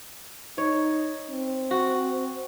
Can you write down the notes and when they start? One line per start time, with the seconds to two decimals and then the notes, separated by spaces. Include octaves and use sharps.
0.58 D#4 C#5
1.30 C4
1.71 F#4